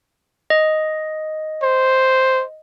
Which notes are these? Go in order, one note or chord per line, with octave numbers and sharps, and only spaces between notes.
D#5
C5